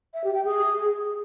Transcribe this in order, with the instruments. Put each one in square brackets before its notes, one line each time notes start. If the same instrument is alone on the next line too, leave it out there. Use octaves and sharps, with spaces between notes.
[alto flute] E5
G4
G5
G#4